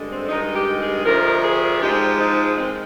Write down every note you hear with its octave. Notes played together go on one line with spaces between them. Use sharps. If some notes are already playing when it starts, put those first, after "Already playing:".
Already playing: G2 D3 G#3
C4
G2 D#3 G#3 D#4
G4
G#4
D2 C3 F3 A#4
G#4
G#2 F3 G#3 G4
D#4
D#3 G#3 C4